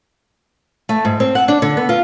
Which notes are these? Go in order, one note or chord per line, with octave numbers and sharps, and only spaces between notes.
A3
G#2
C4
F#5
D4
D3
B3
F4